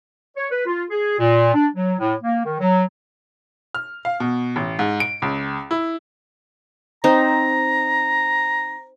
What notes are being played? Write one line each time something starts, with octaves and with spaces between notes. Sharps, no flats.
C#5
B4
F4
G#4
A#2
D4
F#3
A2
A#3
D#3
F#3
F6
F5
B2
A1
G#2
D7
C#2
E4
C4 D#4 A#5